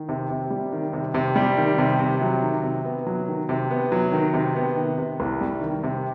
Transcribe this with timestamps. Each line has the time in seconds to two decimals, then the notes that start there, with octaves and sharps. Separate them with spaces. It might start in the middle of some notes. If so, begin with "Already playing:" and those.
Already playing: D#3
0.09 C3
0.30 C3
0.50 G3
0.72 D#3
0.93 C3
1.14 C3
1.36 G3
1.57 D#3
1.78 C3
1.99 C3
2.21 F#3
2.42 D#3
2.63 C3
2.85 B3
3.06 F#3
3.28 D#3
3.49 C3
3.71 B3
3.92 F#3
4.12 D#3
4.33 C3
4.56 B3
4.76 D#3
4.98 C3
5.20 C2
5.41 G3
5.61 D#3
5.83 C3